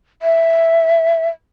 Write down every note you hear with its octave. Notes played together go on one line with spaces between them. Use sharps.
E5